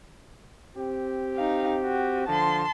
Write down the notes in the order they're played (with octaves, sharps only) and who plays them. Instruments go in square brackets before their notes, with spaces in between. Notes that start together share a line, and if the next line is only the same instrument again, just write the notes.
[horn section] C4 G4
[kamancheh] D#4 F5
F#4
[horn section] D3 F3 [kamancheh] A5 C6